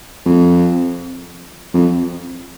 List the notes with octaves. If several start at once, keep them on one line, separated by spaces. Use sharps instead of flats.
F2
F2